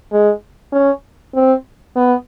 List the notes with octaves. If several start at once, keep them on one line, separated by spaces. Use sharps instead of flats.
G#3
C#4
C4
B3